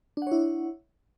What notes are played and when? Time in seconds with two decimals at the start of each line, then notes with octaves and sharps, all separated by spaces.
0.17 D4
0.22 F#5
0.27 C#5
0.32 E4